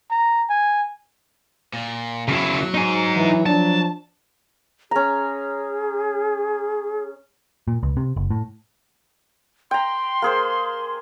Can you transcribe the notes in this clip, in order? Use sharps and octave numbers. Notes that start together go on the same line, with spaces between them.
A#5
G#5
A#2
C#3 F#3 E4
D#4 G#5
E3
F3 D4 A5
C#4 G#4 A#5
A#2
C#2
C3
F#1
A2
G5 A#5 C6
A#3 G#4 C5